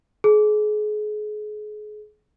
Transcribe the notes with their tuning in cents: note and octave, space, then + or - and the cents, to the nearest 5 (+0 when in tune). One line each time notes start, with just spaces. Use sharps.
G#4 +35